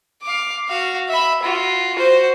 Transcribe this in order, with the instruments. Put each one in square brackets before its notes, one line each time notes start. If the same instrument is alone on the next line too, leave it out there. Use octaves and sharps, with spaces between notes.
[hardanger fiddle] F5 D6
F#4 F5
E5 B5
F4 F#4
F#4 C5